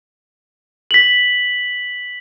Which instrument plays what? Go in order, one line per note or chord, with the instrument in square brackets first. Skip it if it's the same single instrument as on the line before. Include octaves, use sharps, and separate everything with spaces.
[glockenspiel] B6 F#7